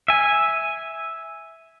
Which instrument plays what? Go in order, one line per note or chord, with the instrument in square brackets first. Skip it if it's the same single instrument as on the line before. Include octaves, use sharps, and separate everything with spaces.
[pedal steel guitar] E5 G#5